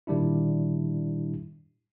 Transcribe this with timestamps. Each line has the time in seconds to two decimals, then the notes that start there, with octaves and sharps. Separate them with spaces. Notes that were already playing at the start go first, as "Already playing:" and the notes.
0.07 A#2 D#3 G3 D4 E4